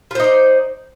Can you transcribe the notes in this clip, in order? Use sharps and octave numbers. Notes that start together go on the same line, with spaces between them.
D#4 F4 C5 D5